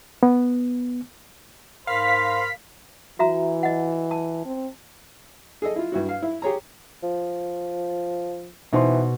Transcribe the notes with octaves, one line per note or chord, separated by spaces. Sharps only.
B3
G#2 A#4 C5 F5 B5 B6
E3 F#4 E5 A#5
D#5 F#5
A5
C4
G#4 A4 D#5
E4 F4
G2 E4 F#4
F5
E4
G4 G#4 C#5 A#5
F3
B2 E3 D#4 C5 C6